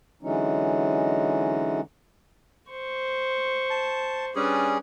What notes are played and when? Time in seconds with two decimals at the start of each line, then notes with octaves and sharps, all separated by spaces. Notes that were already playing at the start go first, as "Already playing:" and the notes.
0.23 D3 E3 F#3 G#3 C#4 D#4
2.69 C5 C#6
3.70 A5
4.36 G3 C#4 D4 G#4 B4